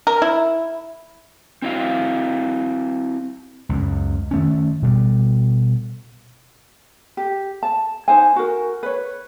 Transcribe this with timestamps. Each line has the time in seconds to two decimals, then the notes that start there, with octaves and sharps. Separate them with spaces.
0.07 A#4
0.22 E4
1.62 C4 E4 F#4 F5
3.69 C#2 F#2
4.31 D#3 A3 C#4
4.82 B2 G3
7.17 G4
7.63 A5
8.08 D#4 C5 G#5
8.36 F#4 A#4
8.83 B4 C#5